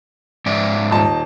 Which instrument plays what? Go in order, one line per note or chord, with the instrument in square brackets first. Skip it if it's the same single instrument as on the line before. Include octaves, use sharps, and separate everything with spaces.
[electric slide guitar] G#2 D5 E5
[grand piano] D#1 D#4 A5